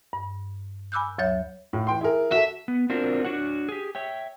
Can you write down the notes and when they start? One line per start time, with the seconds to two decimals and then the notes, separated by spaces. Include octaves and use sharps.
0.13 G2
0.92 G#5 B5 D6 E6 F#6 G6
1.18 D2 F#3 C#5 E5 G6
1.73 A2 F4
1.87 E3 G5 C6
2.01 E4 G#4 A#4
2.31 F#4 A4 E5
2.68 B3
2.90 C4 D4 F4 F#4 A#4 C5
3.25 D4 F#4 C#5 F#5
3.69 G4 G#4
3.95 C#5 E5 G5